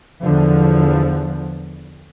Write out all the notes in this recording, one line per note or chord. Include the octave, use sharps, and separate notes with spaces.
E2 D3 F3